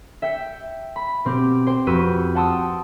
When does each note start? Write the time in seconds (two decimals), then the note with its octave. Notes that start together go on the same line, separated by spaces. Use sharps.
0.22 E5 G5 G6 C#7
0.96 B5
1.25 B2 C4 G4
1.67 C5 G5
1.87 F2 F#4 B4 E6 G6 D#7
2.35 F#5 G5 A5 C6 D#6 E6